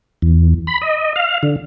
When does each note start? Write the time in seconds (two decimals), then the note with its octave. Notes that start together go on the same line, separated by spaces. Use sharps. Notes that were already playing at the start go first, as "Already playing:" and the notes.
0.22 E2
0.67 B5
0.82 D#5
1.16 F5
1.43 D3